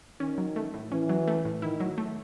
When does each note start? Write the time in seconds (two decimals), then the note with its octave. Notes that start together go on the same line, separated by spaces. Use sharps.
0.20 D#3 C#4
0.38 F#3
0.56 A3
0.74 A2
0.91 E3 C#4
1.09 F#3
1.27 A3
1.45 A2
1.62 D#3 E4
1.80 F#3
1.98 A3